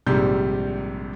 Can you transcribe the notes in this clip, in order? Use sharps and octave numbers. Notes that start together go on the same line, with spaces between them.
A#1 G#2 C3 G3 G6